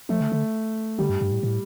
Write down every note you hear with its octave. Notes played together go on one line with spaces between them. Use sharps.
F3 A3
D3
D3
D3 G3
G2
G2
A2
A2